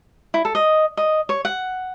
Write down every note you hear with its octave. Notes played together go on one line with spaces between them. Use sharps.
E4
A4
D#5
D#5
C#5
F#5